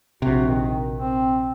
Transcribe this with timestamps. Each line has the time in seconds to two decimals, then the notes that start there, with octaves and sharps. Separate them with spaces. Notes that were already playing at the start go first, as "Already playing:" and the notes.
0.22 A#1 C3 F#4
0.47 D#3
0.99 C4